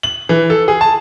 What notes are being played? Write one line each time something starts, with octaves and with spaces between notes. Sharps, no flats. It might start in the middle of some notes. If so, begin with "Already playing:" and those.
F#7
E3
A4
G#4
A5